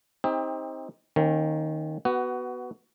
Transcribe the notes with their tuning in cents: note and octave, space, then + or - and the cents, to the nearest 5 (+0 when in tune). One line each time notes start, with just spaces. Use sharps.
C4 +15 D#4 +25 G4 +35
D#3 +0 A#3 +0 C#4 -35
B3 +0 F#4 +20